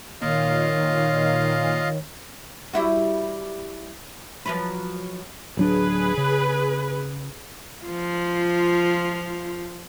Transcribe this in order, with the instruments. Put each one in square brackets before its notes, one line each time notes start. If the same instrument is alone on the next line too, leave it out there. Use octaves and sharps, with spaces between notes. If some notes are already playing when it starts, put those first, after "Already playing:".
[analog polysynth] A#2 [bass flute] D#3 [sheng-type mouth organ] F4 D#5 F5 [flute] C#5
[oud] G3 E4 F#4
F3 F#3 B4
[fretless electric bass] D1 F#3 D4 [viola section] G#4 B4
[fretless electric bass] C#3
[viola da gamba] F3 F4